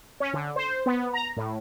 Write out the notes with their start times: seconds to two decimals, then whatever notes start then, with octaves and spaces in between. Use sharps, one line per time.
0.20 C#4
0.34 D3
0.56 C5
0.86 B3
1.13 A#5
1.37 A2